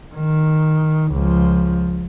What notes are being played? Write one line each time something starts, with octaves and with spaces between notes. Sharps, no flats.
D#3
C#2 F3